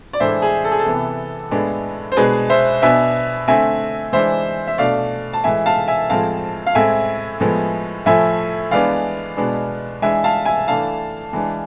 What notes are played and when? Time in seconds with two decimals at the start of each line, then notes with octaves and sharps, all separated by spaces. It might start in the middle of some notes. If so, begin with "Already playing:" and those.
0.13 D5
0.20 A2 E3 G#3 D4 C5 E5
0.42 G#4
0.65 A4
0.72 G#4
0.79 A4
0.85 C3 E3 B3
1.51 A2 G#3 B3 D4
2.12 C5
2.17 B2 G#3 D4 G#4 B4
2.50 C5 E5
2.82 B2 B3 D4 E5 G#5
3.48 D3 A3 C4 E5 G#5
4.13 E3 G#3 D4 C5 E5
4.67 E5
4.78 B2 A3 D4 D5 F5
5.33 A5
5.44 A2 E3 G#3 E5 G#5
5.66 F5 A5
5.88 E5 G#5
6.09 A2 F3 G#3 C4 F5 A5
6.67 F5
6.75 A2 G#3 C4 E5 G#5
7.40 A2 F3 G#3 B3
8.06 A2 F3 A3 E5 G#5
8.71 E3 G#3 B3 D4 D5 F5
9.37 B2 G#3 B3 D4
10.02 E3 G#3 D4 E5 G#5
10.24 F5 A5
10.45 E5 G#5
10.67 E3 A3 D4 F5 A5
11.33 E3 G#3 D4